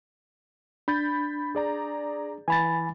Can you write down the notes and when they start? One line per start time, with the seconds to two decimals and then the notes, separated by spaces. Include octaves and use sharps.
0.88 D4 B5 G6 A6
1.55 G#4 D5 A#5
2.48 E3 G#5 B5 A6